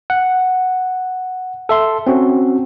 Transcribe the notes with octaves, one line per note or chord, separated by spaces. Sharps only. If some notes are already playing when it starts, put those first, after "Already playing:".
F#5
A4 E5 C6
C4 C#4 F#4